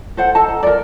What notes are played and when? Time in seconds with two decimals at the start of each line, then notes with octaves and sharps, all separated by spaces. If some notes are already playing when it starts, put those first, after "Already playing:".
0.17 A4 C5 F#5
0.35 A4 D#5 A5 A#5
0.63 A#4 D5